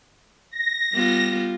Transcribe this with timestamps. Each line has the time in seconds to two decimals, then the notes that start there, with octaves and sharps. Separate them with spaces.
0.51 A#6
0.93 G3 B3 F4